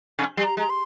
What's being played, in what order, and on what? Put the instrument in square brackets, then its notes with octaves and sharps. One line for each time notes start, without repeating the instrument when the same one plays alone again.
[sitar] C3
G3
[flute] A#5
[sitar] G#3 [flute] A#5
[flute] C6